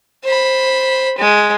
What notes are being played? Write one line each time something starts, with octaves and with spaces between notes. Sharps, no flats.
C5 B5
G#3